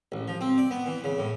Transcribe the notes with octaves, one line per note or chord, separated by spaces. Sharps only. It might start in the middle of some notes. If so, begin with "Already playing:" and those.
A1
F3
C4
D5
B3
E3
C#3
A2